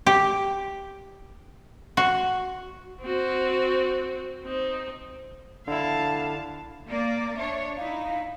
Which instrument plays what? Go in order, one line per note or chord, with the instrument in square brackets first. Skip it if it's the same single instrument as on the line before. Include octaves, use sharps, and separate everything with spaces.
[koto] G4
F#4
[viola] C4 F#4
C4 D#4
[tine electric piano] D3 E4 [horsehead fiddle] F5 A5
[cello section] A#3 D5
[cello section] D4 C#5 [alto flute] E5
[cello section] D#4 E4 [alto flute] F5